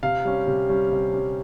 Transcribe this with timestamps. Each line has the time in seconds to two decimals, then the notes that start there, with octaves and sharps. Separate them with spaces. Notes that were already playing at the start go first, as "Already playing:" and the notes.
0.03 C3 F5
0.25 G3 C#4
0.47 C3
0.69 G3 C#4
0.92 C3
1.13 G3 C#4